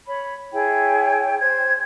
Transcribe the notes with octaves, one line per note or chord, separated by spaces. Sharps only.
C#5 B5
E4 G#4 C#5 G5
C5 G#6